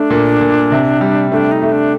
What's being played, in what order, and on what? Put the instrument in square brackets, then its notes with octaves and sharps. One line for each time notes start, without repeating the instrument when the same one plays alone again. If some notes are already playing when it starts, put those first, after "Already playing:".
Already playing: [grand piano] A3 [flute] D4
[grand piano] A#2
A#2
C3
G3
[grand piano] A3 [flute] D4
[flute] D#4
[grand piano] A3
[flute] D4